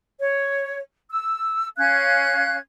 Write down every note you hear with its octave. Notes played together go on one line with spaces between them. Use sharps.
C#5
E6
C#4 F5 F#6 G#6